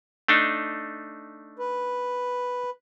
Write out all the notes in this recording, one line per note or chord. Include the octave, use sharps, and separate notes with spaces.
A3 D4 D#4
B4